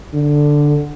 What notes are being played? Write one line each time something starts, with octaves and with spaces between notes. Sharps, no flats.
D3